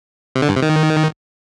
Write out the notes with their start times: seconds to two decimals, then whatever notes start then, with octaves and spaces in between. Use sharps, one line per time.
0.36 C3
0.42 D3
0.49 G2
0.56 C3
0.62 D#3